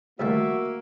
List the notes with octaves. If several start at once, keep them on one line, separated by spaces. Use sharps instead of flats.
C2 D#3 A3 A#3 F#4 E5